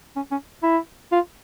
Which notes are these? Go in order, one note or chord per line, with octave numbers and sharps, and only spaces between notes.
C#4
C#4
E4
F4